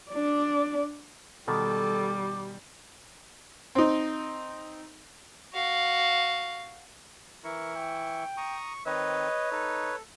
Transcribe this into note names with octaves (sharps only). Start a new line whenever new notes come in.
D4 D5
B2 D#3 G3 A4 D6
C4 D#4
F#4 F5
E3 E4 A#4 C#6
G5
A#5 C#6 D#6
D#3 C4 D#4 B4 C#5 D#5
D#4 A4